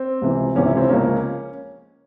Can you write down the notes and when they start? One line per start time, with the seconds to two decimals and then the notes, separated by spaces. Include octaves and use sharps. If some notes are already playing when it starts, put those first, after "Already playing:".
Already playing: C4
0.22 C#2 C3 E3
0.55 C#2 C3 E3 C#4
0.66 E4
0.77 C4
0.89 C#2 C#3 F3 A#3 C#4